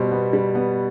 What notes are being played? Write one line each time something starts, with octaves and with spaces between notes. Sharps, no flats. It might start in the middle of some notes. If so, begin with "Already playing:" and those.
Already playing: B2 G3 C5
B3
G3
B3